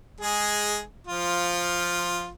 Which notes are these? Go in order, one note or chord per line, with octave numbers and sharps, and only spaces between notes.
G#3 G#4
F3 F4